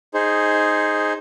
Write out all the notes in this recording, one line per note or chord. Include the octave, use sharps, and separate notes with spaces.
D#4 G#4 C5